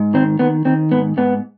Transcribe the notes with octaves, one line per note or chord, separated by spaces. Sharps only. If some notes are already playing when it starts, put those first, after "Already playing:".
Already playing: G#2
D#3 C4
D#3 B3
D#3 C4
G#2 B3
G#2 B3